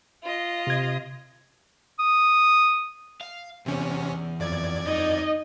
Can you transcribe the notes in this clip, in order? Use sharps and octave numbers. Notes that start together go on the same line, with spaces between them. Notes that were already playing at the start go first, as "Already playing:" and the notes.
F4 D#5
C3 G#6
D#6
F5
E2 C3 C#4
F2 D5 G#6
D#4 D#5